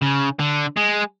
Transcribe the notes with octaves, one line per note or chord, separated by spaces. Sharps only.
C#3
D3
G#3